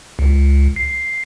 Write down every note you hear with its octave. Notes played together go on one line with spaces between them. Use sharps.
C#2
C7